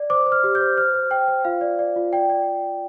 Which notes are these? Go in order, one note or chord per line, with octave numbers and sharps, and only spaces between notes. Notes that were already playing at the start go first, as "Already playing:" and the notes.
Already playing: D5
C5 D6
C5
F6
G4
G6
C5
C5 F6
C5
C5 G5
C5
F4 F5
D5
D5
F4
D5 G5
D5